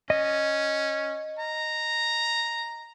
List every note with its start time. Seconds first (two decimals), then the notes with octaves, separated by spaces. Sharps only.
0.10 C#4 D#5
1.39 A#5